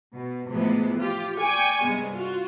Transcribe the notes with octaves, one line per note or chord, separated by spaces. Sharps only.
B2
A2 C3 E3 F3 G#3 B3
F4 G4
D5 G5 G#5 C#6
G2 C3 G#3 B3
F4 F#4